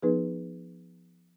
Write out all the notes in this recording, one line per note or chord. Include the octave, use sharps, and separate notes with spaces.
F3 B3 D#4 G#4 B4